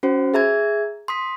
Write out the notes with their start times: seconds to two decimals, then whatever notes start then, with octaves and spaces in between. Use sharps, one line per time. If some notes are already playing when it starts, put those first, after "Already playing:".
0.03 C#4 F#4 C5
0.34 G#4 E5 A#5 G#6
1.08 C6 D#6 B6